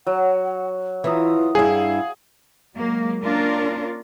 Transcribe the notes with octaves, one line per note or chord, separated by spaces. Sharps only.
F#3 F#5
E3 F4 E5 A#5 D#6
G2 E4 G#4 F5
F#3 G#3 A#3
A#3 C#4 D4 F4 A#4